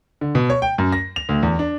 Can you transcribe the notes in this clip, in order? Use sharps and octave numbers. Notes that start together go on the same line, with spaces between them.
D3
B2
C#5
G5
F#2
A#6
F7
D2
E2
D4